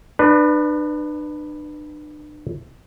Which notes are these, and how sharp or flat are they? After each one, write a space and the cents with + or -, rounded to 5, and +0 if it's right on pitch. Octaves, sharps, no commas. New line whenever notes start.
D4 +40 B4 +0 D5 +5